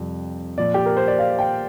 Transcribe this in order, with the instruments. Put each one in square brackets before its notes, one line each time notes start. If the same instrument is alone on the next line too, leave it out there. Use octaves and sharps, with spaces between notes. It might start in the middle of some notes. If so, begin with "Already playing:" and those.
Already playing: [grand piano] F2 C3 G3
A#2 F3 D5
G4
A#4
C5
D5
F5
G5